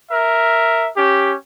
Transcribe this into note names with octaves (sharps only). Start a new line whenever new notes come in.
A#4 E5
C#4 G4